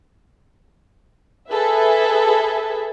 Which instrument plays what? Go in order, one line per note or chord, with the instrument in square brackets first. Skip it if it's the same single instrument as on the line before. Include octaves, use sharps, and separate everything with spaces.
[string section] G#4 A4 B4 E5